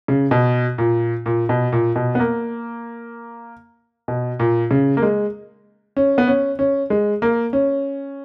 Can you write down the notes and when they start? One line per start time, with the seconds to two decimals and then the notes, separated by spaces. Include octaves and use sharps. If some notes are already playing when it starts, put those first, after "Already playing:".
0.08 C#3
0.31 B2
0.78 A#2
1.26 A#2
1.49 B2
1.72 A#2
1.96 B2
2.15 B3
2.20 A#3
4.08 B2
4.40 A#2
4.71 C#3
4.97 A#3
5.02 G#3
5.97 C#4
6.18 B3
6.27 C#4
6.59 C#4
6.90 G#3
7.22 A#3
7.53 C#4